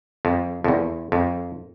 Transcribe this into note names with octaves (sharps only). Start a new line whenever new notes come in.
F2
F2
E2
F2